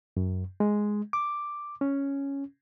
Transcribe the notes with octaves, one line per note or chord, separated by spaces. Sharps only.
F#2
G#3
D6
C#4